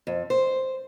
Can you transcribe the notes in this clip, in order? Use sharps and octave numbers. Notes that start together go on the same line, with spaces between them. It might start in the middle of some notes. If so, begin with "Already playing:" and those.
F2
C5